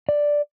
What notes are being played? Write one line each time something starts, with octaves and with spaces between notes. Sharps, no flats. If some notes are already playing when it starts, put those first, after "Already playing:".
D5